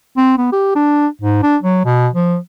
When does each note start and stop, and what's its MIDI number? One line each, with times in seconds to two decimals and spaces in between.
0.17 0.37 60
0.38 0.49 59
0.52 0.71 67
0.76 1.07 62
1.21 1.42 44
1.43 1.57 62
1.63 1.84 54
1.85 2.08 47
2.13 2.37 53